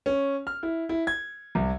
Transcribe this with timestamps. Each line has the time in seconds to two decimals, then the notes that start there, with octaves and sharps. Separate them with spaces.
0.06 C#4
0.47 F6
0.63 E4
0.89 E4
1.07 G#6
1.55 C2